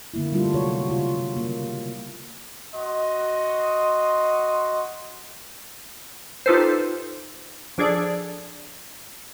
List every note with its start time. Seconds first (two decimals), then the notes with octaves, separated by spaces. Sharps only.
0.14 D3 A#3 E4
0.32 G3 A3 D4 F4
0.54 C3 F#3 F#4 C#5
0.90 C#3 F4
1.37 A#3
2.75 F#4 D#5 C6
6.46 D#4 F4 G4 A4 B4 C5
7.78 F3 D4 G#4 A4 D5